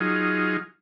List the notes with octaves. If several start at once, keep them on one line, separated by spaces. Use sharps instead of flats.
F#3 D#4 F4 G#4